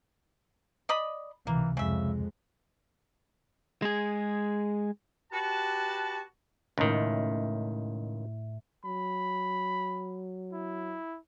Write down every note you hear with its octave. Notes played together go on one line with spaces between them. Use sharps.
D5 D#5 B5
C#2 C3 E3 A#3
F2 C#3 G#3 E5
G#3 G#4
F#4 G4 B4 A5
C#2 A2 D#3 A3
F#3 B5
E4